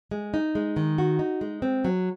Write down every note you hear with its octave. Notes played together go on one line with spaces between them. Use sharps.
G#3
D#4
G#3
D#3
F#4
D#4
G#3
C4
F#3